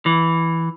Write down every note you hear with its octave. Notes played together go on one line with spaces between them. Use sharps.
E3